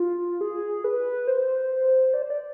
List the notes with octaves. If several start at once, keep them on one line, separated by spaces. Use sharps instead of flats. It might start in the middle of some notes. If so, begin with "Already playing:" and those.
Already playing: F4
G#4
B4
C5
D5
C5
D5